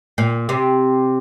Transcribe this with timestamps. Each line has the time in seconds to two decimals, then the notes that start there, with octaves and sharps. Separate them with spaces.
0.18 A#2
0.49 C3